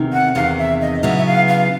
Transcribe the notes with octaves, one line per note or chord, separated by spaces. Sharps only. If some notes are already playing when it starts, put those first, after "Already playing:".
Already playing: E2 C3 D#3
F#5
E2 C3 D#3 F5
E5
D#5
C#3 F#3 B3 E4 E5
E5
F5
F5